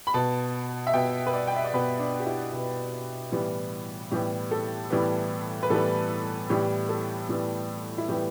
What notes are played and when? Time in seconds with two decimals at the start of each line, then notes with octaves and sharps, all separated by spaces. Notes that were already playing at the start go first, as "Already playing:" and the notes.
0.07 B5
0.14 B2 B3 A5
0.87 E5
0.94 B2 B3 G5
1.26 B4
1.33 D5
1.47 G5
1.56 E5
1.64 D5
1.74 B2 B3 B4
1.99 D4
2.20 G4
2.26 E4
2.53 B2 B3
3.32 A2 E3 G3 B3
4.11 A2 E3 G3 B3 G4
4.51 A4
4.90 A2 E3 G3 B3
5.63 B4
5.70 A2 E3 G3 B3 A4
6.50 A2 E3 G3 B3 G4
6.89 A4
7.29 A2 E3 G3 B3
7.98 E4
8.08 A2 E3 G3 B3 G4